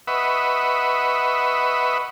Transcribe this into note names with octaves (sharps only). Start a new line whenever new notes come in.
B4 D#5 E5 F#5 B5 C#6